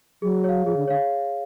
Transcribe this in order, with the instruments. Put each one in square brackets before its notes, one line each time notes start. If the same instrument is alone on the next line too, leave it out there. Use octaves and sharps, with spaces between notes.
[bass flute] F#3 [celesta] G#4
[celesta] C#5 F5
[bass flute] F3 [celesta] G#4
[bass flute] D3
[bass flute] D3 [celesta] C#5 F5